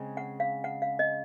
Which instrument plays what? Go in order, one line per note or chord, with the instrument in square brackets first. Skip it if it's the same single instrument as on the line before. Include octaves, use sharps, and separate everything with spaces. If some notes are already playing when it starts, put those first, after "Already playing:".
Already playing: [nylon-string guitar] C#3 G#3 C4
[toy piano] F#5
F5
F#5
F5
D#5